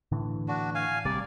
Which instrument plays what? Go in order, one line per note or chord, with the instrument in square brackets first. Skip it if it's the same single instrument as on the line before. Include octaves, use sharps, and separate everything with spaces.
[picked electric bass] A2 D3 E3
[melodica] D4 F#4
F5 G#5
[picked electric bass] A1 C3 G3 [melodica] D5